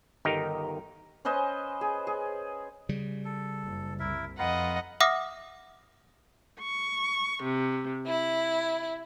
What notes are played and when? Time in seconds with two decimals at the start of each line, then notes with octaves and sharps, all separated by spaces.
0.25 G1 D#3 D#4 G4 A#4
1.25 C#4 B4 C5 D#5
1.81 G#4
2.07 G#4
2.89 C#3 G3
3.25 A4
3.64 F#1
4.00 C2 E4 A#4 E5
4.38 F2 F4 B4 D#5 F#5 A#5
5.00 E5 F#5 D6 D#6 F6 A#6
6.60 C#6
7.43 C3
8.05 E4